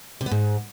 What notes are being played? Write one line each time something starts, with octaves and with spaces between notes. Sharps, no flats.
C3
B3
G#2